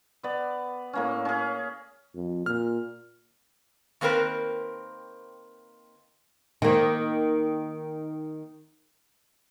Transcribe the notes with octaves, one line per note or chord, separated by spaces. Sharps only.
B3 D5
A2 A#3 C#4
C#4 G#4
F2
A#2 F6
D#3 A#3 C4 A#4 B4
D#3 A#3